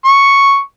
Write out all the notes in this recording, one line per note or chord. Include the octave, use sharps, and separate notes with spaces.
C#6